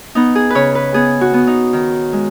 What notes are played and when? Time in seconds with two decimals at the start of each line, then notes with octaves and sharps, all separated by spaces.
0.15 B3 D#4
0.35 G#4
0.50 C#3 B4 C#5
0.75 B4
0.94 B3 G#4
1.21 F#4
1.34 B3
1.47 D#4
1.73 D#3
2.13 G#3